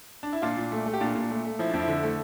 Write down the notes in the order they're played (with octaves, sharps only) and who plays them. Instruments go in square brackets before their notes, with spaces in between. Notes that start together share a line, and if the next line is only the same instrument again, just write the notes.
[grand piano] D4
E4
A#2 D4 F4
A#2
A3
A3
G4
A#2 D4 F4
A#2
A3
A3
F3 E4
F2 D4
E4
D3
A3